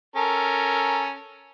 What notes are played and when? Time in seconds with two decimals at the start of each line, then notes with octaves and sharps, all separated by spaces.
0.16 C#4 A4 A#4